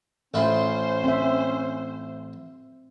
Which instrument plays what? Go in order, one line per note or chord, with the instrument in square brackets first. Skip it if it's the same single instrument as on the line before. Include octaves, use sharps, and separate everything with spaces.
[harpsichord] A1 E4 F4 [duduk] C#4 [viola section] C5
[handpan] C4 E5